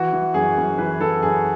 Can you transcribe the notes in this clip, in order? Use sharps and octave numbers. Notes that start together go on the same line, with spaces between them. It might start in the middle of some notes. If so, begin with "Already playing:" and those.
Already playing: E3 F#4
E3
F#2 G#4
F#2
E3 B4
E3 A4
F#2 G#4